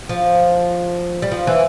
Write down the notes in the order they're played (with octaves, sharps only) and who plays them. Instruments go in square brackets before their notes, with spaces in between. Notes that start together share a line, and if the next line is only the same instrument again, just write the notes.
[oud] F3
G3
F3
E3